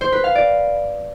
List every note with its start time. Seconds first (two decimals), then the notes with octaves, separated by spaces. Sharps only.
0.01 C5
0.12 B4
0.24 F5
0.35 D5